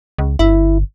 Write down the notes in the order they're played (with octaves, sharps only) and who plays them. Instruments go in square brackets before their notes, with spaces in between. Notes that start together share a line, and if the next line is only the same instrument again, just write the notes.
[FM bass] C#2
[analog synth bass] G1 [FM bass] E4